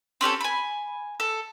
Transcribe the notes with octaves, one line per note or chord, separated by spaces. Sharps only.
C4 C#4 G4 A4
G#5 B5
A4